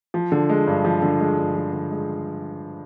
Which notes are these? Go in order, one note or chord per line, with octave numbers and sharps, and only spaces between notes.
F3
D3
G#3
G2
F3
D3
G#3
G2
F3
D3
G#3